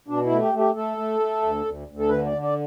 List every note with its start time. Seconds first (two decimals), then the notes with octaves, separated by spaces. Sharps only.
0.08 B2 D4
0.25 E4
0.31 A3
0.42 G4
0.53 A3
0.59 G4
0.75 A3 A4
0.97 A3
1.20 A3
1.42 D2
1.65 D2
1.88 D2
1.99 A4
2.09 D3 B4
2.26 D5
2.32 D3
2.42 D5